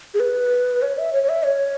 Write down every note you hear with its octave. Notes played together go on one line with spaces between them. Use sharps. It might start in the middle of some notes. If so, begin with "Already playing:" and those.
G#4
B4
C#5
E5
C#5
C#5
E5
C#5